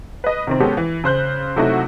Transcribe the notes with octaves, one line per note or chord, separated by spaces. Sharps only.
B4 D#5
C3 D#3 C4
G#3 B3 C#4 G4 A4
E3
C#3 C5 F#6 G6
C3 F#3 A3 D#4 E4 F#4